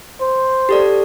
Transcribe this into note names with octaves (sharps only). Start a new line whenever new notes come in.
C5
G4 A4 D5